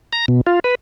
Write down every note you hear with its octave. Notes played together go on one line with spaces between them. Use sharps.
A#5
B2
F4
B4